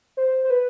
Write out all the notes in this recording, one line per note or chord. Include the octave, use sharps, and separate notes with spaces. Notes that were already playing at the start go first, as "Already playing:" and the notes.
C5
C5
B4